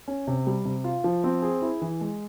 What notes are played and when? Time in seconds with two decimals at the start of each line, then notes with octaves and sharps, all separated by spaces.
0.08 C#4
0.27 C3
0.47 G3
0.65 C3
0.84 F4
1.04 F3
1.24 C4
1.42 G#4
1.62 E4
1.82 E3
2.01 G#3